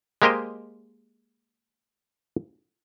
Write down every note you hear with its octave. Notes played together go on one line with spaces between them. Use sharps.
G#3 A#3 G4 A#4 C5 D#5